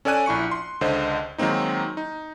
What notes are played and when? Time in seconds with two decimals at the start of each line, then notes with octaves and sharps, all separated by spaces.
0.05 C#4 A4 D5 G#5 F#6 D#7
0.26 A#1 E4 C#6 C#7
0.51 C6
0.81 C#2 D3 C5 D#5
1.38 D#3 F#3 G#3 A#3 C4 D#4
1.97 D#4